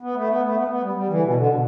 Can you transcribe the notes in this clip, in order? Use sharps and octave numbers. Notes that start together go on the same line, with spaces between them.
B3
A3
B3
A3
B3
B3
G3
G3
E3
D3
B2
D3
B2